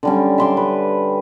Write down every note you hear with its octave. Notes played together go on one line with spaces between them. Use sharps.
D3 G3 C#4
E5 C6 D6
B4